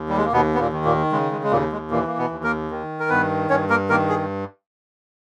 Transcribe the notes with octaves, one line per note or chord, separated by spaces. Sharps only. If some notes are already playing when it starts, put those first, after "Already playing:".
Already playing: D#2
G3
G#3
A#3
D#2 B2 B3
B3
A#2 A#3
D#3
A#2 A#3
C#3 G#3
G#3
G#3
D#2 A#2 A#3
G#3
A#2 E3 A#3
A#3
B2 B3
D#2
A#3 A#4
D#3
A#4
G2 B3 B4
G2 C#4 C#5
A#3 A#4
D#3 A#3 A#4
G#4